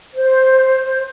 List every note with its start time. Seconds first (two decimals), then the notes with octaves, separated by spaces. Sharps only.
0.14 C5